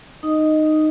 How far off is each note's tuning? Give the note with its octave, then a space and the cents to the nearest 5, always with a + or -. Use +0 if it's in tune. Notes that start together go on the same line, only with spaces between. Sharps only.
D#4 -15 D#5 +0 D#6 +0